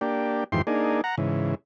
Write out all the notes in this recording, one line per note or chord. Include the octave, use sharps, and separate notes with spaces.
A#3 D4 G4
F2 G#2 D#3 E3 G4 C6
A#3 D4 D#4 G#4
F#5 A#5
G#2 C#3 E3